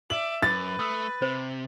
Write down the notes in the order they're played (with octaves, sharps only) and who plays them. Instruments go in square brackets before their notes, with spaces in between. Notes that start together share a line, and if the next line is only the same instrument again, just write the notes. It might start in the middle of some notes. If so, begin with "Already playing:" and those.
[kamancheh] D5 E5 [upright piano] F#7
[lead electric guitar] F#2 [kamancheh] B4 [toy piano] D6 [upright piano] A6
[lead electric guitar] A3 [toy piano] D#6 E6
[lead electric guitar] C3 [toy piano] C5